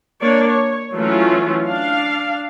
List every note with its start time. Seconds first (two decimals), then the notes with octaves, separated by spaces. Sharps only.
0.21 A#3 D4 C#5 D5
0.49 C#5
0.94 E3 F#3 A3 C#4 F4
1.67 D4 F5